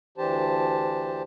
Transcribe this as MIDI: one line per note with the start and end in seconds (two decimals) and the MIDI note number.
0.18 1.22 38
0.18 1.22 52
0.18 1.22 62
0.18 1.22 67
0.18 1.22 72
0.18 1.22 81